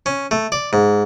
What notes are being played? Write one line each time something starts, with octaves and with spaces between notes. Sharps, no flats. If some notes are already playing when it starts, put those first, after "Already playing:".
C#4
A3
D5
G#2